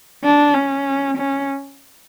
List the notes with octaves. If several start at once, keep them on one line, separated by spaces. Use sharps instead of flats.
D4
C#4
C#4